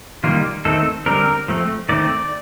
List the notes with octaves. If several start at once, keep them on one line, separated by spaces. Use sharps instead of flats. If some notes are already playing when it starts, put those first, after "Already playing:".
D#3 G3 A#3 F4
D#3 A3 C4 A4
D3 G3 C4 A#4
F3 A3 C4
D#3 A3 C4 D5